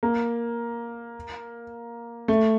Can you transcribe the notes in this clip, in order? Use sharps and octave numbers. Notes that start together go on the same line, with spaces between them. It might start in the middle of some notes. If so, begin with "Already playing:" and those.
A#3
A3